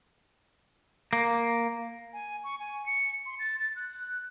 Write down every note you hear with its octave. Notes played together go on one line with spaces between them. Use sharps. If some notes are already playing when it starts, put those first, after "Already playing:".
A#3
G#5
C#6
G#5
C#7
C6
A6
A6
F#6